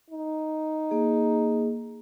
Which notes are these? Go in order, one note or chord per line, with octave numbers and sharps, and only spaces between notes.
D#4
A#3 G#4